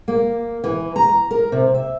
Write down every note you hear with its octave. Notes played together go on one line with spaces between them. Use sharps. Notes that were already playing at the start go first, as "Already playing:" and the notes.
A#3
E3
A#5
A#4
C3
E5